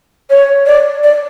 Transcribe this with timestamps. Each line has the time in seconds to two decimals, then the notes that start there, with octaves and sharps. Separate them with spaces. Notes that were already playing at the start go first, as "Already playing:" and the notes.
0.30 C#5
0.67 D5
1.03 D5